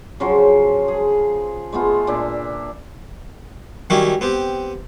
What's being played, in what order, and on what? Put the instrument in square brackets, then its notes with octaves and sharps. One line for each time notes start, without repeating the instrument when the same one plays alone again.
[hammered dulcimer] C#3 F3 F#3 C5
G#4
G#3 A3 B3 F4
A#2 D4 E5
[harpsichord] D#3 F#3 G3 C#4 E4 G4
B3 C4 G4